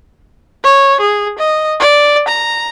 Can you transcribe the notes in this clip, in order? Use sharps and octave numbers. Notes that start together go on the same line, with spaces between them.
C#5
G#4
D#5
D5
A#5